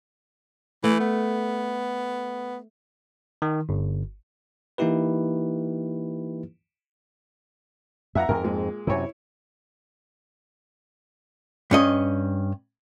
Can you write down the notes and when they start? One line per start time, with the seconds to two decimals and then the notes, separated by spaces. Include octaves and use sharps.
0.84 E3 A3
1.00 B3
3.42 D#3
3.69 G1
4.78 E3 A#3 D#4 E4 G4 B4
8.15 F2 E5 F#5 A#5
8.29 F2 G#2 A#4
8.43 A#2 G#3
8.87 F#2 C3 E4 C#5
11.71 G2 C#4 D#5